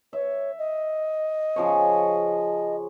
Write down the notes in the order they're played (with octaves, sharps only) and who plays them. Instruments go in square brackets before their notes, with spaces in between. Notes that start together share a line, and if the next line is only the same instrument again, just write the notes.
[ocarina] C#5 [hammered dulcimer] E5
[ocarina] D#5
[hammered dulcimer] C#3 F3 C#5